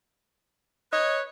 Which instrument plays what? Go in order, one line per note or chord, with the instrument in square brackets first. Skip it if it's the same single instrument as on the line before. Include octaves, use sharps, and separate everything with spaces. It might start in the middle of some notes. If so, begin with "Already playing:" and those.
[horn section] B4 C#5 [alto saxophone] D#5